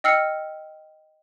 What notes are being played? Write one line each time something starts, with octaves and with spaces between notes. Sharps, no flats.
D#5 G5 E6 F6 C7 C#7